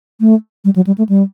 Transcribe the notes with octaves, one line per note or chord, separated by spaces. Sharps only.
A3
G3
F#3
G3
A3
G3